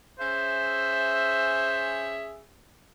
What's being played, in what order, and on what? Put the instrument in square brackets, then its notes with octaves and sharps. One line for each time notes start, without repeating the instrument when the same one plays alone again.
[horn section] C#4 G#4 E5 [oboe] C5